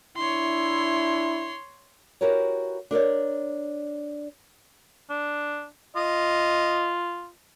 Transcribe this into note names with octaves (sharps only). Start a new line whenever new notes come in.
D4 E4 C#5 C6
E4 F#4 G4 A#4 B4 C#5
D4 A#4 C#5 D5
D4
F4 D#5